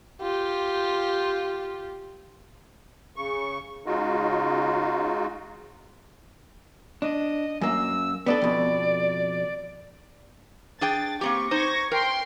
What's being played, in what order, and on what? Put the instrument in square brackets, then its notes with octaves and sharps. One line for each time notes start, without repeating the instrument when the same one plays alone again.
[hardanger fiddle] F4 G4
[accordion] C#3 C#6
C#3 G#3 D#4 F4 F#4
[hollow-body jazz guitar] D4 [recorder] D#5
[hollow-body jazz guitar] F#2 A#3 [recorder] E6
[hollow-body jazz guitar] B3 D4 A4 [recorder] D5
[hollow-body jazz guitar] F2 B2
[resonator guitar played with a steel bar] D4 G#4 G5 [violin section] A6
[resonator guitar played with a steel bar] A#3 C4 G4 [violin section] C#6
[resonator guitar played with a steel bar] D#4 C5 [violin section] C#6 G#6 A#6
[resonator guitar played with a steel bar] A#4 [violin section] G5 C6